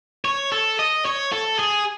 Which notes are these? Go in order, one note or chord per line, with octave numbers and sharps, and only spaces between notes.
C#5
A4
D#5
C#5
A4
G#4